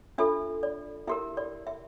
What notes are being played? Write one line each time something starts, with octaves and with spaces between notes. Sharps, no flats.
D4 F4 A4 E5
D5
E4 G4 A#4 E5
D5
E5